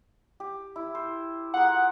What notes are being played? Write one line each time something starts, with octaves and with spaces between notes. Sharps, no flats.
G4
E4
C5
F4 G#4 A#4 F#5